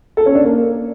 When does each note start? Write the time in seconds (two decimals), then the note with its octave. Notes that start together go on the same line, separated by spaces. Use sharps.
0.17 A4
0.26 C#4
0.35 D4
0.44 A#3